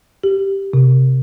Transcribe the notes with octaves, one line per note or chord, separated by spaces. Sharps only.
G4
C3